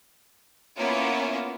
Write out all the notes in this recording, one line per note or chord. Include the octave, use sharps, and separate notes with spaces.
A#3 B3 C#4 E4 F4